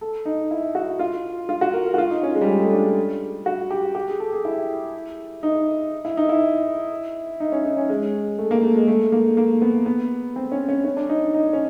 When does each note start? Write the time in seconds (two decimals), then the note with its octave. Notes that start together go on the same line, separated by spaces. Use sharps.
0.01 A4
0.25 D#4
0.51 E4
0.75 F#4
0.99 F4
1.49 F4
1.61 F#4
1.73 A#4
1.86 A#4
1.94 F#4
1.98 F4
2.10 D#4
2.23 C#4
2.35 G#3
2.41 G3
2.47 G#3
2.60 A3
2.73 D4
3.46 F#4
3.70 G4
3.95 G4
4.08 G#4
4.20 A4
4.32 G#4
4.45 E4
5.43 D#4
6.05 E4
6.17 D#4
6.29 E4
7.40 D#4
7.52 C#4
7.65 D#4
7.77 C#4
7.90 G#3
8.39 A3
8.51 A#3
8.63 A3
8.75 G#3
8.88 A3
9.12 A#3
9.37 A#3
9.62 B3
9.86 B3
10.36 C4
10.52 C#4
10.69 C#4
10.85 C#4
10.97 D4
11.09 D#4
11.34 D#4
11.53 C#4